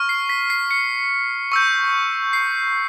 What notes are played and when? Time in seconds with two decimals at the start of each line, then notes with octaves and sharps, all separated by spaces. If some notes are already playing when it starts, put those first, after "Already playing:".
Already playing: C#6 F6
0.09 C7
0.29 B6
0.50 C7
0.71 C#7
1.52 C#6 E6 G6
2.33 C7